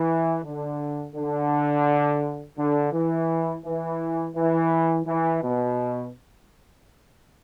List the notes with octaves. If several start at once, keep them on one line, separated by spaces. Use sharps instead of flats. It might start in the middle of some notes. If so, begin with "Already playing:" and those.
Already playing: E3
D3
D3
D3
E3
E3
E3
E3
B2